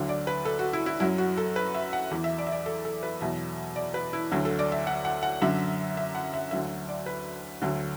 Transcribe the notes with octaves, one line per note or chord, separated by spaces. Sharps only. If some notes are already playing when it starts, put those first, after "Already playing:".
Already playing: D2 D3 F#3
D5
B4
A4
F#4
E4
E4
F#2 F#3 E4
F#4
A4
B4
E5
F#5
E2 E3
E5
D5
E5
D5
A4
A4
B4
E2 B2 F#3 E5
D5
B4
E4
D2 D3 F#3 F#4
A4
D5
E5
F#5
F#5
F#5
F#2 D3 F#3 E5
E5
F#5
E5
D2 D3 F#3 E5
D5
B4
D2 D3 F#3